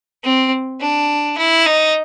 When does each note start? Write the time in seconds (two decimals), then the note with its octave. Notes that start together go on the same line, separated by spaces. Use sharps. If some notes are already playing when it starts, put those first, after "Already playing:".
0.24 C4
0.81 D4
1.38 E4
1.66 D#4